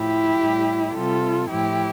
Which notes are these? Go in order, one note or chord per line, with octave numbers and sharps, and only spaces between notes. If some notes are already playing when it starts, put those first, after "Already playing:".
Already playing: A2 F3 E4 G4
A2 G3
C3 G3 F4 A4
A2 F3 E4 G4